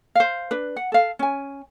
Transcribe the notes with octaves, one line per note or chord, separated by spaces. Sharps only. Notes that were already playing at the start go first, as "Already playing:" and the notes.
C5 F5
D4 B4
F#5
A4 F5
C#4 G#5